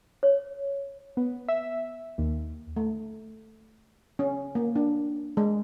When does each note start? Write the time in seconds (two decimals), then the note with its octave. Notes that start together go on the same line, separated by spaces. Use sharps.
0.23 C#5
1.17 B3
1.48 E5
2.18 D#2
2.77 A3
4.19 C#4
4.55 A#3
4.76 D4
5.37 G#3